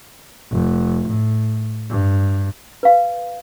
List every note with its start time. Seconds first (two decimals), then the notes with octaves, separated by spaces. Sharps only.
0.52 F1
1.08 A2
1.89 G2
2.83 B4 F5